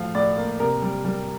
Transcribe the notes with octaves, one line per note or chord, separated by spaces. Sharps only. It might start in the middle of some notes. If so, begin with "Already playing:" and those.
Already playing: A2 F3 F5
A2 D5
A#3
C3 A#4
G3
G3